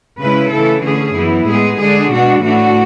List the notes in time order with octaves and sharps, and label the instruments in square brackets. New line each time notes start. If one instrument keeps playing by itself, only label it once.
[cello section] C#3 G#3 C#4 E4 B4
C#3 E3 A3 E4 A4
D3 A3 C#4 G#4
F#2 E3 B3 E4
A2 G#3 B3 G#4
D3 G#3 D4 G#4
B2 G#3 D4 F#4
A2 E3 A3 D4 F#4